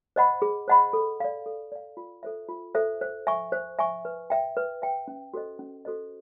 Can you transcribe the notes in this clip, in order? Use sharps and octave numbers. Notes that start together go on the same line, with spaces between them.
C5 D#5 F#5 B5
G#4
C5 D#5 F#5 B5
A4
D5 F5
A4
D5 F5
F4
A4 C5 E5
F4
A4 C5 E5
C5
E5 G#5 C#6
C5
E5 G#5 C#6
B4
E5 G5
B4
E5 G5
C#4
F#4 A4 C5 D#5
C#4
F#4 A4 C5 D#5